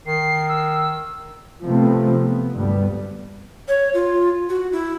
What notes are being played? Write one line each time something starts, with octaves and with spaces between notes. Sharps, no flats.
D#3 C7
E6
C3 F3 A3 B3 C4
B3
D2 G2 G3 B3
C#5
F4
F#4
E4